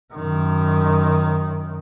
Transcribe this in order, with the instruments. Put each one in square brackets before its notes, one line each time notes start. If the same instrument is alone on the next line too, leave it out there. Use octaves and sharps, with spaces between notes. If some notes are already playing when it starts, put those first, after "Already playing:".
[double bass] F#2 D#3